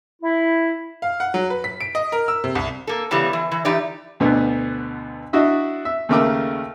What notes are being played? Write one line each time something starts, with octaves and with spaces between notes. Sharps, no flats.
E4
F5
F#5
F#3
B4
B6
D7
D#5
A#4
E6
C3
C2
A#3 A4
C#3 E3 G3 B3
E3
E3
E3 D#4 G4 D5
D2 B2 D3 B3
D4 E4 F#4 D#5 E5
E5
D#2 C#3 A3 A#4 D6 E6